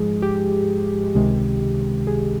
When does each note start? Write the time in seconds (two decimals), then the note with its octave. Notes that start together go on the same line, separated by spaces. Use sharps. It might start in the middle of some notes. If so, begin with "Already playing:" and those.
Already playing: G#2 F3 G#3 G#4
0.22 G4
1.15 C#2 C3 D#3 G#3
2.07 G#4